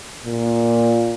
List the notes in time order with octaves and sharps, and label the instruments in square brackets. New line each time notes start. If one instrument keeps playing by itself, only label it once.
[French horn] A#2